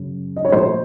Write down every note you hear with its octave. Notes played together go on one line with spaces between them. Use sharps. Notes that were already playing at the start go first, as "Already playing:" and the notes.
Already playing: F#2 C#3
D#5
C#5
A#2 F3 C5